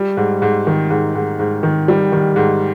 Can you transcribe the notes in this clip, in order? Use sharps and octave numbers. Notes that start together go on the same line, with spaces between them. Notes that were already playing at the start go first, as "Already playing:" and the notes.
Already playing: G3
G#2
G#2
D#3
G#2
G#2
G#2
D#3
G3
D#3
G#2